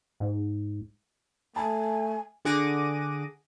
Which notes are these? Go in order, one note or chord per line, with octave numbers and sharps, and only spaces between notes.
G#2
A3 G#5 A5
D3 G#4 F#5 D6 A#6 D#7